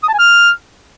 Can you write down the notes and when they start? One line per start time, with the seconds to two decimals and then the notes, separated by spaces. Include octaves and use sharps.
0.03 D#6
0.08 A5
0.13 G#5
0.19 F6